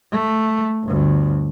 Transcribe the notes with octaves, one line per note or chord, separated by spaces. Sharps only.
A3
G1 D2